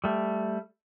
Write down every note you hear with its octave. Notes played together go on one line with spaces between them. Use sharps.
G3 A3